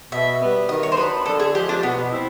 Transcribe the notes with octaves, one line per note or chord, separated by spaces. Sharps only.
B2 E5
G3 B3
D#3 D#5
C#5
C5
F#3 B3 D4 B4
D3 A4
G#4
F3 G#3 G4
D4
B2 B3
C4 E4